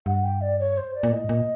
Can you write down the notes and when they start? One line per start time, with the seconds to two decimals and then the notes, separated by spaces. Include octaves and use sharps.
0.06 G2 F#5
0.24 G5
0.41 D5
0.59 C#5
0.77 C5
0.94 D5
1.03 A#2
1.12 A2 D#5
1.29 A#2